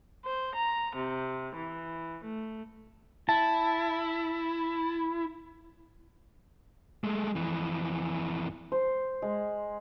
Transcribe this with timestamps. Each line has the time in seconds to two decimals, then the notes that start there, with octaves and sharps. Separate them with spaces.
0.24 C5
0.56 A#5
0.94 C3
1.54 E3
2.24 A3
3.29 E4 A5
7.04 G#3 A3
7.35 F2 E3
8.72 C5
9.22 G#3